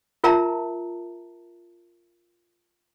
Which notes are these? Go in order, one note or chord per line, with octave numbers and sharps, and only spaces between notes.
F4 A#4 E5 A5 A#5